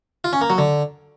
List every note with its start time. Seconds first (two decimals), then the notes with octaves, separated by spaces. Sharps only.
0.24 F4
0.33 C#4
0.41 A#3
0.50 F#3
0.58 D3